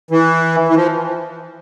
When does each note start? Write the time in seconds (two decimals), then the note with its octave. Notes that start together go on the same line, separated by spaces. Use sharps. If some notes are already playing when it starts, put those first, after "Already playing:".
0.11 E3
0.69 E3
0.76 F3